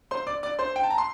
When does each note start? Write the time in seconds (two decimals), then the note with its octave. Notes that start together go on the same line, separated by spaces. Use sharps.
0.11 C5 C6
0.27 D5 D6
0.43 D5 D6
0.59 C5 C6
0.76 G5
0.83 A5
0.90 A#5
0.98 C6